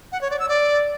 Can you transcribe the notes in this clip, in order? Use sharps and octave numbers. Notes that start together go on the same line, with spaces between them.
F#5
C#5
D5
E6
D5